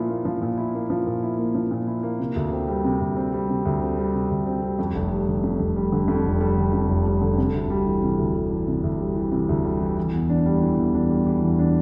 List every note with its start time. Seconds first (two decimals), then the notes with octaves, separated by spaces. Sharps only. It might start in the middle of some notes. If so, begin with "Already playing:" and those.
Already playing: A#2 F3 E4
0.09 A#3
0.25 F3
0.42 A#2
0.58 E4
0.74 A#3
0.90 F3
1.06 A#2
1.23 E4
1.39 A#3
1.55 F3
1.71 A#2
1.87 E4
2.03 A#3
2.19 C3
2.36 D2
2.52 C4
2.68 G3
2.85 C3
3.01 D2
3.17 C4
3.33 G3
3.49 C3
3.65 D2
3.81 C4
3.98 G3
4.14 C3
4.30 D2
4.47 C4
4.63 G3
4.79 F2
4.95 F1
5.12 G3
5.27 D3
5.43 F2
5.60 F1
5.76 G3
5.92 D3
6.08 F2
6.24 F1
6.41 G3
6.57 D3
6.73 F2
6.89 F1
7.06 G3
7.22 D3
7.38 C3
7.54 D2
7.70 G3
7.87 E3
8.02 C3
8.19 D2
8.35 G3
8.52 E3
8.67 C3
8.83 D2
9.00 G3
9.16 E3
9.32 C3
9.49 D2
9.64 G3
9.81 E3
9.97 E3
10.13 E2
10.29 D4
10.46 G3
10.62 E3
10.78 E2
10.94 D4
11.10 G3
11.27 E3
11.43 E2
11.59 D4